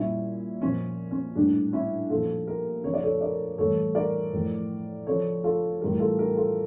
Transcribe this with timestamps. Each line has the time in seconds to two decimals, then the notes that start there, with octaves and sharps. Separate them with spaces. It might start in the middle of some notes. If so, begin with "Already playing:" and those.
Already playing: A#2 G3 C#4 E4
0.61 A#2 F3 C#4
1.11 C#4
1.35 A2 G3 D4
1.73 C#4 E4
2.10 A#2 F3 F4 A4
2.47 G4 A#4
2.84 C#3 F3 C#5
2.94 D5
3.03 A4 C#5
3.21 A#4 D5
3.58 A2 E3 G3 A4 C#5
3.95 A#4 D5
4.33 A2 F3
5.06 C#3 F3 A4 C#5
5.44 F4 A4
5.81 A2 E3 G3 G4 A#4
6.00 F4 A4
6.19 G4 A#4
6.36 F4 A4